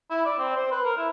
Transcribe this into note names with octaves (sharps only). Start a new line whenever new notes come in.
E4
D5
C4
C5
B4
A#4
E4